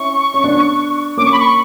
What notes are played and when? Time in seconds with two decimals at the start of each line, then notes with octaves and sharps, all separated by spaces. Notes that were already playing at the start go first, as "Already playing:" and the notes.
Already playing: C#4 E4 C#6
0.34 C#4
0.44 B3 D4
1.17 A#3 C#4 D6
1.25 C#6
1.32 B5
1.39 C#6